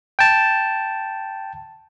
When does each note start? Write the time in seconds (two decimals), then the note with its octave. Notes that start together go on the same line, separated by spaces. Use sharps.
0.19 G5 A5